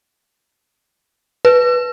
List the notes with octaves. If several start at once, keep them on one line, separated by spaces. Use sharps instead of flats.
B4